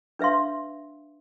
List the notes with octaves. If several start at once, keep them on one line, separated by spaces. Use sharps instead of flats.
D4 B4 E5 F5 C6